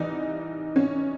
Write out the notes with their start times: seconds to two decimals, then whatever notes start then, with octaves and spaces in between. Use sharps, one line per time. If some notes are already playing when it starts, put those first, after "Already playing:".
Already playing: C2 C3 E3 D#4
0.76 C#4